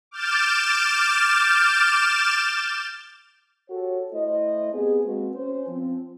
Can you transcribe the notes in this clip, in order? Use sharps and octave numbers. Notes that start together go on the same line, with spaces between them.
D6 F6 G6 A6 E7
F#4 G4 A4 C#5
A3 E4 C5 D#5
B3 C4 G4 G#4
G#3 A#3 C4 F#4 B4
C#4 C5
F3 C4